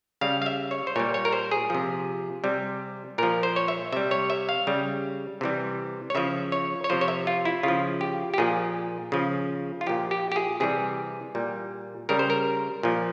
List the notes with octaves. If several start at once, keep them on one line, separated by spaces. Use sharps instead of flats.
C#3 G3 F5
F5
E5
C#5
C5
A#2 G3 C#5
C#5
A#4
C5
G#4
C3 F3
C3 G3
A#2 F3 A#4
C5
C#5
E5
C3 G3 E5
C#5
E5
F5
C#3 G3
C3 E3 G3
C#5
C#3 F3 E5
C#5
C#5
C3 F3 C5
C#5
E5
F4
E4
C#3 F3 F4
G4
G4
A#2 F3 G#4
C#3 F3
F4
A#2 F3 G4
G4
G4
G#4
C3 E3 G3 G#4
A#2 G3
C#3 G3 A#4
C5
A#4
A#2 F3